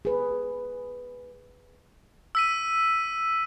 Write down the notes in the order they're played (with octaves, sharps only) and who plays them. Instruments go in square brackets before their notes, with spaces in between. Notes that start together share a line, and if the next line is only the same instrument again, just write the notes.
[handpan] G#4 B4
[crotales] E6 B6 D#7